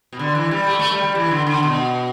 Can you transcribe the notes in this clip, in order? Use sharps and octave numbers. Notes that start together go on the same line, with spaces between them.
B2
D3
E3
G3
A3
A3
G3
G3
E3
D3
D3
B2